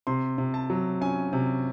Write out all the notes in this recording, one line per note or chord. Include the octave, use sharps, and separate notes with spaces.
C3 C6
C3
A5
F#3
C#4 G#5
C3